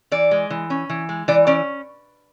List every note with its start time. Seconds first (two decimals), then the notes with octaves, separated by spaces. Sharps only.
0.12 E3 D5
0.31 G#3
0.50 E3
0.70 C#4
0.90 E3
1.09 G#3
1.28 E3 D5
1.47 C#4 D5